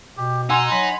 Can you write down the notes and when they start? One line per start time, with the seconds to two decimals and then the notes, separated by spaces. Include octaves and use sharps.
0.17 B2 G4
0.50 D#4 F#5 G#5 C6 E6
0.71 F#3 B5